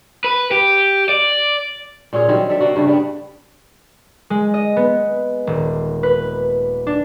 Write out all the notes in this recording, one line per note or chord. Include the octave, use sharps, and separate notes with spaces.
B4
G4
D5
A#2 C#4 F4 G#4
D#3 F#3 G3 C4
D4 A4 E5
A#3 D4 F#4
G2 C#3 A3 F#4
G3 B3 D4
G#3
D#5
B3
D#1
B4
D4